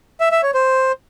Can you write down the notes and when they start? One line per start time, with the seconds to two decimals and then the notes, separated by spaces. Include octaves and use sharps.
0.20 E5
0.32 E5
0.43 C#5
0.54 C5